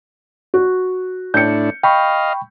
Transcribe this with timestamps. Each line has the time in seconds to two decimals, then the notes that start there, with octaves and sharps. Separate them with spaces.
0.54 F#4
1.34 A2 D4 G6 C#7
1.83 D#5 F5 G5 B5 C#6